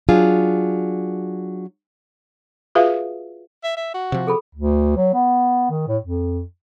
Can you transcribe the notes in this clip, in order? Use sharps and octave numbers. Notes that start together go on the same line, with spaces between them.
F#3 D4 F4 G#4
F4 F#4 G#4 B4 E5 F5
E5
E5
F#4
C3 F3
G#4 A4 B5
D2
F#3
B3
D#3
A2
F2